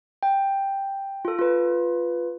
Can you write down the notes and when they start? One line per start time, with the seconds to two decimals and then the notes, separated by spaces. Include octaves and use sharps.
0.23 G5
1.25 F4 A4
1.39 F4 B4